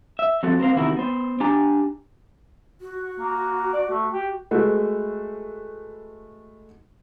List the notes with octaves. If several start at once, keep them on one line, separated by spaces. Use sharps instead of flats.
E5
F3 C4 F#4 A4
C4 A#4 C5 F5
E2 C3 D#3 E4 F#4 A#4
B3 C5
D4 G4 G#5 A#5
F#4
A#3
D5
A3
G4
G#3 A3 F#4 B4